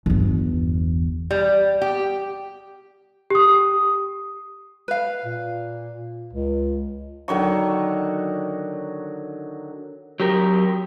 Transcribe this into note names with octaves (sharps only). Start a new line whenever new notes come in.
G1 E2
G3
G4
G4 D#6
B4 F5
A#2
C#2
D3 D#3 F#3 C#6
F#3 G4 A#4